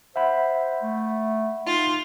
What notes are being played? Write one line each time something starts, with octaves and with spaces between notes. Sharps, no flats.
C5 E5 F#5 B5
A3
D#4 F4